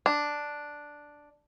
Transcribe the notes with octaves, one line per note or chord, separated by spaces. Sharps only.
D4